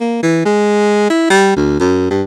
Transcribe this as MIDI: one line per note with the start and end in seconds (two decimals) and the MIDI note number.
0.01 0.22 58
0.23 0.42 52
0.45 1.07 56
1.10 1.30 64
1.30 1.53 55
1.56 1.75 38
1.80 2.07 42
2.11 2.23 43